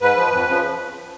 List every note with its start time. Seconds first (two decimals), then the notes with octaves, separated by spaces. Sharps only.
0.01 G#2 B4
0.17 F3
0.32 F2
0.48 C#3 F3